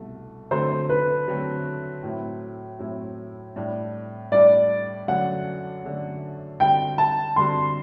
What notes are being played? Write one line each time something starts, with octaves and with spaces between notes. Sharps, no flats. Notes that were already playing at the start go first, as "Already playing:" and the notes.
Already playing: C2 B2 A3
D3 F#3 A3 C4 F#4 C5
B4
D3 F#3 A3 C4 F#4
A2 F#3 C4 E4
A2 F#3 C4 E4
A2 G3 D4
A2 G3 D4 D5
F#2 D3 F#3 A3 D4 F#5
F#2 D3 F#3 A3 D4
D3 G3 C4 F#4 G5
A5
D3 G3 C4 F#4 C6